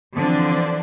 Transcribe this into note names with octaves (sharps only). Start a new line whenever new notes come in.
D3 E3 F3 C4 D4